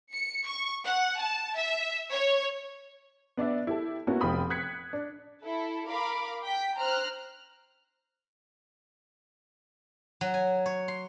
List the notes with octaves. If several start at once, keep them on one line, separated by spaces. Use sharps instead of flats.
C#7
C#6
F#5
A5
E5
C#5
B3 D4 D5 E5
E4 G4 A4
A#3 B3 C#4 E4 F#4
F1 F5 G5 B5 D#6
D#6 F#6 G#6 B6 C#7
D4
E4 A4
A#4 F5 B5 D6
G5 B6
C5 A#5 F6 F#6
F#3
G#5
C#5
C6